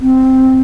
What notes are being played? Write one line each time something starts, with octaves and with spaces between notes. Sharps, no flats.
C4